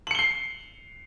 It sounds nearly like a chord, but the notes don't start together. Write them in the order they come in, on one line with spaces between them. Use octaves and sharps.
F#7 C#7 G7 C7